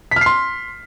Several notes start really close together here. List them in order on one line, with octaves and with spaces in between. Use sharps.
B6 F6 C7 C6